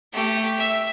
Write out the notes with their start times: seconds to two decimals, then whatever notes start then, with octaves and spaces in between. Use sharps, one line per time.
0.13 A3 G4
0.58 E5